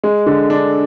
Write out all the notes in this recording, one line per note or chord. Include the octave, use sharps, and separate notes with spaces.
G#3
D3
D4